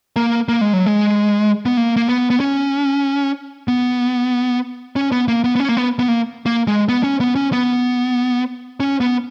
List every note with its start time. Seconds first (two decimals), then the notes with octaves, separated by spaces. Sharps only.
0.16 A#3
0.48 A#3
0.61 G#3
0.73 F#3
0.86 G#3
1.66 B3
1.77 A#3
1.96 A#3
2.09 B3
2.30 B3
2.40 C#4
3.68 B3
4.96 C#4
5.12 B3
5.28 A#3
5.44 B3
5.56 B3
5.60 C#4
5.69 A#3
5.77 B3
5.99 B3
6.08 A#3
6.46 A#3
6.67 G#3
6.89 B3
7.03 C#4
7.21 B3
7.35 C#4
7.52 B3
8.80 C#4
9.01 B3